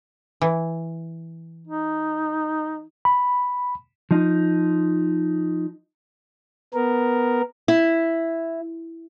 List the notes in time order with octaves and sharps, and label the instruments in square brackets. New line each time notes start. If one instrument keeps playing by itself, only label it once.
[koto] E3
[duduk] D#4
[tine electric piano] B5
[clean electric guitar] F3 D#4
[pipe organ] B3 A#4
[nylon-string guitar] E4